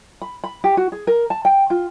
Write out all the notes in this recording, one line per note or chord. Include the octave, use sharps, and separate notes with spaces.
B5
B5
G4
F#4
G#4
A#4
A5
G5
F4